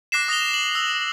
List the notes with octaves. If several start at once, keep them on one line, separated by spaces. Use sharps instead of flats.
D6 F#6 A#6 C7 E7
D#6 A#6 F7 G7
F#7
E6